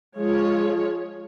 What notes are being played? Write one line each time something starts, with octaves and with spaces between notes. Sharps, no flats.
F3 G#3 F4 G#4 C#5